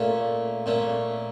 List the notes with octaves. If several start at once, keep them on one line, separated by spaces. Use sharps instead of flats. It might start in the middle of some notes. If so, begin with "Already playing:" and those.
Already playing: A#2 A3 C#4
A#2 A3 C#4